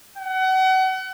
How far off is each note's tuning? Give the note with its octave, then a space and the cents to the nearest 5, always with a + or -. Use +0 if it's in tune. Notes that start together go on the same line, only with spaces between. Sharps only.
F#5 +30